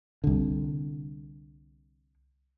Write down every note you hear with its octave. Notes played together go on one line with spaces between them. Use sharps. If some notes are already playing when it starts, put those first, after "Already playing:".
C2 D3